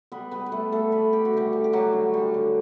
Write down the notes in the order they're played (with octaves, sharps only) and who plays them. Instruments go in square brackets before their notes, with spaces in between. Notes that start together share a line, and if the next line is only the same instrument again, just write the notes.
[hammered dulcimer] G3 B3 B4
G3 B3 B4
B4
G3 A3 A4
G3 A3 A4
G3 B3 B4
G3 G4
F#4
D3 G3 G4
G3
G4
F#3 G3 F#4
D3
G3
D3